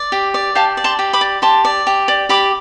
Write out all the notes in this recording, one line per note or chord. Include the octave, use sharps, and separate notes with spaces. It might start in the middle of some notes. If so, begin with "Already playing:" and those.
Already playing: D5
G4
D5
G4 F5 A5
D5
A5 C6
G4
B5 D6
D5
G4 A5 C6
D5
G4
D5
G4 B5 D6